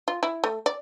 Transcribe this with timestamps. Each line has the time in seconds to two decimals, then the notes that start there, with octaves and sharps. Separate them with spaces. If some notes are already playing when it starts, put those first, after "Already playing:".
0.08 F4
0.23 E4
0.44 A3
0.66 D5